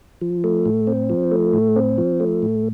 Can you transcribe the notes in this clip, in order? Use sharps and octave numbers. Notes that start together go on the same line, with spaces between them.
F3
A3
A2
C4
F3
A3
A2
C4
F3
A3
A2